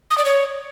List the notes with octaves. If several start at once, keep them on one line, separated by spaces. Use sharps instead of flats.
D#6
D5
C#5